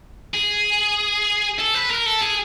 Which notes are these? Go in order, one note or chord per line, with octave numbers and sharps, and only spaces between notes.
G#4
A4
B4
A#4
A4
G#4